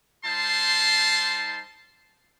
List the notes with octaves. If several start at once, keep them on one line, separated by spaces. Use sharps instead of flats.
G3 D#4 C5 A5 C6